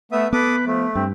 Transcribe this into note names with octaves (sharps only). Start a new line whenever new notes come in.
A3 B3 E5 D#6
B3 A4 B4 D6 D#6
F3 A3
G2 C4